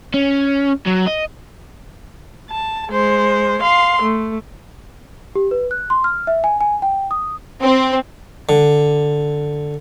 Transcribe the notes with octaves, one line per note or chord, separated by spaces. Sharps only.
C#4
F#3
D#5
A5
G#3 C5
F5 C6
A3
G4
B4
F#6
C6
F6
E5
G#5
G#5
G5
D#6
C4
D3